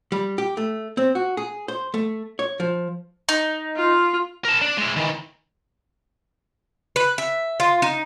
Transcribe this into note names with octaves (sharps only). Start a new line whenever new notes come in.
G3
G4
A3
C4
F#4
G#4
C5
A3
C#5
F3
D#4
F4
A#4 A5
D4
G#3 E4
D#3 E3
B4
E5
F4
D#4